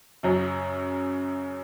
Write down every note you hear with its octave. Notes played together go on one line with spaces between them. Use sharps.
F#2 C#3 F#3